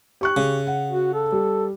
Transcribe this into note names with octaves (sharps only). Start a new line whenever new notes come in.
G4 C#6 F#6
C#3
F#5
F#4
A4
G3